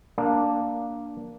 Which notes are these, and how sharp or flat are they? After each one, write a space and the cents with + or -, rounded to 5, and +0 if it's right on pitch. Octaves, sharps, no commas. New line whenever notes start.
A#3 +0 D4 +0